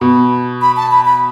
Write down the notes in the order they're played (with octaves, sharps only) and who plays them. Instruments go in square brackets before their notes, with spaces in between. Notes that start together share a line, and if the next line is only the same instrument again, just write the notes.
[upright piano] B2 [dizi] B5
[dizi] B5
A5
B5
B5